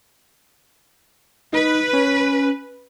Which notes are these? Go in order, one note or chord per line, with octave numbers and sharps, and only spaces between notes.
D#4 B4
C#4